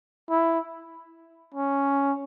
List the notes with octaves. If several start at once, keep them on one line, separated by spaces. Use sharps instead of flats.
E4
C#4